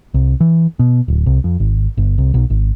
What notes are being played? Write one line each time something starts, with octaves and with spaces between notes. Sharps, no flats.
C2
E3
B2
D1
C2
F2
G#1
G1
C2
B1
G#1